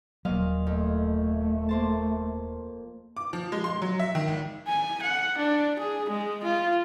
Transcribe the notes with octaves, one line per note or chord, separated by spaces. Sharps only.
D#1 A#2 F#3 D#5 F5
F2 A3
A#3 C5 A5
D6
F3
G#3
C6
F#3
E5
D#3
G#1
G#5
F#5
D4
G#4
G#3
F4